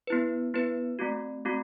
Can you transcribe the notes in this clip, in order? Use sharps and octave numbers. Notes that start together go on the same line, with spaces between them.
B3 E4 B4
B3 E4 B4
A3 C4 F#4
A3 C4 F#4